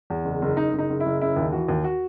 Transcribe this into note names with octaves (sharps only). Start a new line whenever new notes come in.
E2
F#1
F#1
F#1 D#4
F#1
D#4
F#1
E4
F#1
C#3 E4
D#2
E3 F#4
D#2
F#4